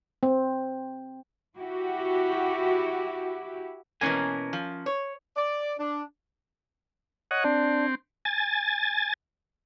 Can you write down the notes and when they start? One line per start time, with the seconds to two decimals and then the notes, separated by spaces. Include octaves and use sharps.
0.23 C4
1.57 E4 F#4 G4
4.01 B2 E3 A#3 C#4 A#4 G#5
4.53 F3
4.86 C#5
5.37 D5
5.79 D4
7.31 C#5 D#5 F#5
7.44 C4 D4
8.25 G#5 A6